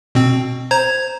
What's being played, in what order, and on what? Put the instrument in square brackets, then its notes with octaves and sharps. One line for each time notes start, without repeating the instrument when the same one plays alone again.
[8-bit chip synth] B2 C4
C5 A#5 G#6